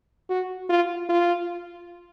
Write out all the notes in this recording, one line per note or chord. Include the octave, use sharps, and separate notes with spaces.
F#4
F4
F4